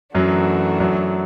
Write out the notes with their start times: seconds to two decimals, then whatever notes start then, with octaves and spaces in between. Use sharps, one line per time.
0.15 F#2 E3 F#3 A3 D4 F#4
0.80 F#2 F#3